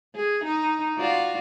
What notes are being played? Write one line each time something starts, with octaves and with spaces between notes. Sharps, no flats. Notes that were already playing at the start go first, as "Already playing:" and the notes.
G#4
D#4
F4 F#4 D5